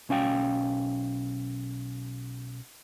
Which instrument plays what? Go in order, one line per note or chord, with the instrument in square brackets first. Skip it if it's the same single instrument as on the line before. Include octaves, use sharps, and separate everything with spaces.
[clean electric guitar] B1 C#4 F5 G5